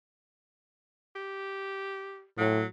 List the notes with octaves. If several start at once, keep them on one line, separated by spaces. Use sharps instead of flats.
G4
A2 F#3